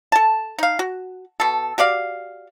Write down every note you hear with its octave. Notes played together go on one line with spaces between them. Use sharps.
A4 A5
D#4 F5
F#4
B2 A4
F#4 G4 D5 F5